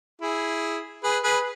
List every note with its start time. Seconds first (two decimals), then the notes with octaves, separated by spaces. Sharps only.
0.22 E4 G#4
1.04 G#4 B4
1.24 G#4 B4